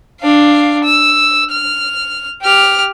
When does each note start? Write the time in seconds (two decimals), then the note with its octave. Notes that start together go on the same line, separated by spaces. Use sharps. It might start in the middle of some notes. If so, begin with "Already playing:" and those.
0.21 D4 F5
0.84 E6
1.51 F6
2.42 G4 F6